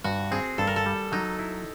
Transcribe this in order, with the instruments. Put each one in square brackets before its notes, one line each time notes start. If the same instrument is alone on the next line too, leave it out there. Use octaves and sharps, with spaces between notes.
[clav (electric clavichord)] G2 [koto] F#4
[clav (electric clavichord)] C4 [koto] G#4
[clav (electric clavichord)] G2 [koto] A4
[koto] A#4
A4
[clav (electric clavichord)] G3
[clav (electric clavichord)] F#3 [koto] D#4
[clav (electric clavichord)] E4